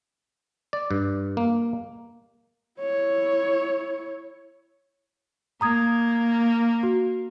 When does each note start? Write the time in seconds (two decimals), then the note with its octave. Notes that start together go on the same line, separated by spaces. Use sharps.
0.73 D5
0.91 G2
1.37 A#3
2.80 E4 C#5
5.61 A#3 A#5 D#6 G#6
6.83 F#4